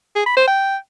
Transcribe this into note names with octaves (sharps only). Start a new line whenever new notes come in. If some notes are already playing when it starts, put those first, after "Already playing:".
G#4
B5
C5
G5